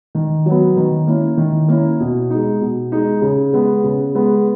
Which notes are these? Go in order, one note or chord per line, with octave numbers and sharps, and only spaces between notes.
D#3
F#3 B3
D#3
A#3 C#4 E4
D#3
A#3 C#4 E4
B2
G#3 D#4
B2
G#3 D#4
C#3
G#3 B3
C#3
G#3 B3